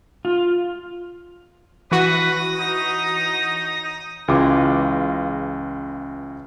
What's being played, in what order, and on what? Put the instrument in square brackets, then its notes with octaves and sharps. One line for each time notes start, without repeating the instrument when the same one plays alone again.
[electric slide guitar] F4
[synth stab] E3 F#4 [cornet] B4 [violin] D#6 A#6
[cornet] D#4
[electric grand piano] C#2 C#3 E3 F4 F5 D6